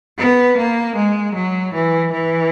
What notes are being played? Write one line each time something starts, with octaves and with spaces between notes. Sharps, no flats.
B3
A#3
G#3
F#3
E3
E3